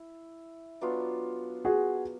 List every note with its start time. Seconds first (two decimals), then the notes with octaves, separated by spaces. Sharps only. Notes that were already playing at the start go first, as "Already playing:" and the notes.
Already playing: E4
0.81 F#3 B3 D4 F4
1.65 F#4 G#4